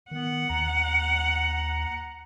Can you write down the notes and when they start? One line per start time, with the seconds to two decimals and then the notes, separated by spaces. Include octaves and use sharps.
0.11 D#3 B3 F#5
0.50 D#2 A#5